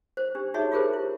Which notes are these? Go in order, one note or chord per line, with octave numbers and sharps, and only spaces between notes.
C5
D4 G4
D#4 F#4 G#4 C#5 E5
F4 G4 G#4 A#4 C5
E4